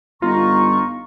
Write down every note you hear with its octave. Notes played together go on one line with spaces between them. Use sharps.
G1 D#4 F4 A#5 C#6